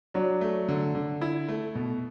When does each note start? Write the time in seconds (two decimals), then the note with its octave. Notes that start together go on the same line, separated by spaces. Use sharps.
0.14 F#3 D4
0.41 A3
0.68 D3
0.95 D3
1.21 E4
1.49 A3
1.75 B2